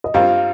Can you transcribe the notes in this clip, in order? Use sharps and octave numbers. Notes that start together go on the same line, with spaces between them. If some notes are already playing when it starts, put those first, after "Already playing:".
D#5
G2 G3 C4 F4 A#4 F5